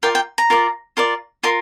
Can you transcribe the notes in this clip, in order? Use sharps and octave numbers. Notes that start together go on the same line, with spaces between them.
F4 A#4 D5 G5
G5
A#5
F4 A#4 D5
F4 A#4 D5
F4 A#4 C6